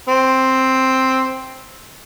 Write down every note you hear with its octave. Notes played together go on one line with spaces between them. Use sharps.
C4